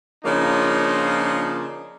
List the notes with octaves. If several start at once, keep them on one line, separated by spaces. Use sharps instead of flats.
C#3 F3 A#3 D4 D#4 F4